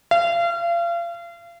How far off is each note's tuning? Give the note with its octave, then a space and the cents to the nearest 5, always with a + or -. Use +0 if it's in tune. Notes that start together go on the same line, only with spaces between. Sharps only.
F5 -35